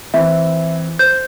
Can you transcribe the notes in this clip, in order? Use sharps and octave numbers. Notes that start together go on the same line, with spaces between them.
E3 C4 E5
C5 G6